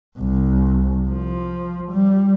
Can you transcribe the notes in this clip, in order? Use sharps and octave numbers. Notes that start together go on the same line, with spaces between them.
C2
F3
G3